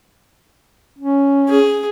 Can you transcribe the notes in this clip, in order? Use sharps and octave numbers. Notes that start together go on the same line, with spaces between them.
C#4
G#4